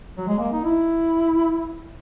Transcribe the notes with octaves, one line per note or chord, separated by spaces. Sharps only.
F#3
G#3
A#3
D#4
E4